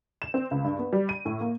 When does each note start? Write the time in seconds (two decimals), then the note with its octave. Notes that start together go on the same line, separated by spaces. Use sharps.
0.22 E7
0.34 C4
0.51 C#2
0.64 G2
0.79 B3
0.93 G3
1.09 D#7
1.25 A2
1.41 A#3